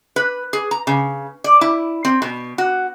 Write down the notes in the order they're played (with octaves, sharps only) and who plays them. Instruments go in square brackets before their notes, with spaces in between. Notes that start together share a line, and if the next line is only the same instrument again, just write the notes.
[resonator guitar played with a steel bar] B4
G#4
A#5
C#3
D5
E4
C4
B2
F#4